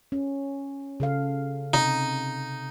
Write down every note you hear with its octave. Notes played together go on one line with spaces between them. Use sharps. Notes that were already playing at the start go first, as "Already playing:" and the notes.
C#4
C#3 A4 F5
C3 D#4